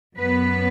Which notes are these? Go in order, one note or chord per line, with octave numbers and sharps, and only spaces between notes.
F#2 F#3 B3 B4